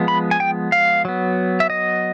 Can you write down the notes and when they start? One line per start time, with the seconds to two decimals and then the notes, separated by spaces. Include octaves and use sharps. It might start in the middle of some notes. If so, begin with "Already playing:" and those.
Already playing: F3 G#3 B3
0.08 B5
0.31 G#5
0.40 G5
0.72 F5
1.05 F#3 B3
1.60 E5
1.70 D#5